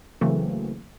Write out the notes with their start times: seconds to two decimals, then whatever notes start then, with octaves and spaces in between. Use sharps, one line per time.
0.21 C#3 E3 F#3 A3 A#3 C4